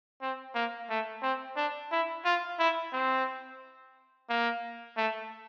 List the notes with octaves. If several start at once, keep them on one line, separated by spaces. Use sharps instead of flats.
C4
A#3
A3
C4
D4
E4
F4
E4
C4
A#3
A3